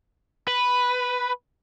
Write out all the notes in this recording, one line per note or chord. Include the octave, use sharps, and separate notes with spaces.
B4